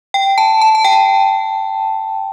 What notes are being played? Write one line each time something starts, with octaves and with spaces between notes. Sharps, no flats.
G5
A5
A5
A5
G5